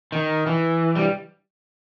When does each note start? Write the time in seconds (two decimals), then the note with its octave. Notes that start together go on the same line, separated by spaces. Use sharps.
0.12 D#3
0.46 E3
0.95 G3